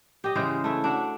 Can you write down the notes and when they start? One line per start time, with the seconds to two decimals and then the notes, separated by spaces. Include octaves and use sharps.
0.24 G4 D#5
0.35 C#3 E3 G#3 C5
0.64 A3 E4
0.84 D4 F#4